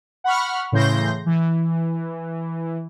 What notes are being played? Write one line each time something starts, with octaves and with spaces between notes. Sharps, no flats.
F#5 B5 C#6 F6
A2 C#3 E3 C6 G6 A#6
E3